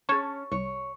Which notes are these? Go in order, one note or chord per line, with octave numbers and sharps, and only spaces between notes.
C#4 G#4 C#5 A5 C#6
C2 C#5